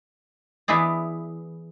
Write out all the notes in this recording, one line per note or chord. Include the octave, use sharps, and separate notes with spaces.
E3 B3 E4 G#4 D5